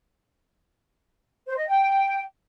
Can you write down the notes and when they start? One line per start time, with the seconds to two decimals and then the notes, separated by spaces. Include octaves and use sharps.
1.47 C5
1.57 D#5
1.67 G5